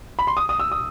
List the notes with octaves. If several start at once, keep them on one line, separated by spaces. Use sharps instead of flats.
B5
C6
D#6
D#6
E6
D#6